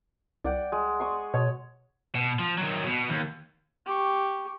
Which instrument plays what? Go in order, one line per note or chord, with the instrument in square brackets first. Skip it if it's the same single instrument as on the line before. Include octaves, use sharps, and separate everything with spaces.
[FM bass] C2 [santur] D5 F#5 G5
[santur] G#3
C6 C#6 D#6
[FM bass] B2 [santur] C#5
[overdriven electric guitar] B2
F3
D#3 F#3
B2
D#2
[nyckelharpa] G4 C#6